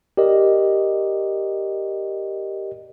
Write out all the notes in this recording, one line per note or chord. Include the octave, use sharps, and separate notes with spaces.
G4 A#4 D5 D#5